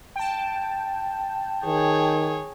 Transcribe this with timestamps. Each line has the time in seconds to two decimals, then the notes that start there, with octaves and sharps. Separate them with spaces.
0.16 G5 A5
1.66 D#3 G#4 C#5